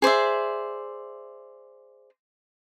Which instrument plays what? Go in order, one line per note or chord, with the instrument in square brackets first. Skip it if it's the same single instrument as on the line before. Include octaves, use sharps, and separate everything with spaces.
[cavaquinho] G#4 C5 D5 E5